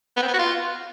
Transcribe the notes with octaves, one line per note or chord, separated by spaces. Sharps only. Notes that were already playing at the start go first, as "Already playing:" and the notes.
B3
C4
B3
F#4
F4